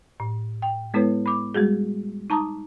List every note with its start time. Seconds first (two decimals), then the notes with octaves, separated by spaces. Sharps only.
0.20 A2
0.62 G5
0.94 G#3 B3 E4 A4 B4 C#5
1.26 B5 D6
1.55 G3 G#3 F#4 G#4
2.30 D#4 A5 A#5 D6 D#6